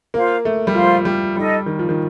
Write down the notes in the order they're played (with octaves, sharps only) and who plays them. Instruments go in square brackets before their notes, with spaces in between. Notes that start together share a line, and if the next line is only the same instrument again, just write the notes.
[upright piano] A#3 [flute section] F4 C5 F5
[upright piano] A3
G3
[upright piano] F3 [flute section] F4 C5 F5 C6
[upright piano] G3
[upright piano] G3 [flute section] D#4 A4 D#5
[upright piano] D#3
F3
D#3